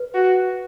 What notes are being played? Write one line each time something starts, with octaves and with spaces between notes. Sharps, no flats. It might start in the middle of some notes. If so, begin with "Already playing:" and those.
Already playing: B4
F#4